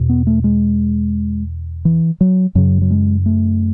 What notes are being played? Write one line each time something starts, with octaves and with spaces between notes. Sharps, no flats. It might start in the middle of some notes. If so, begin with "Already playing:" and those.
Already playing: E2 B2
B3
A3
G#3
E3
F#3
F#2 C#3 F#3
F#3
G#3
A3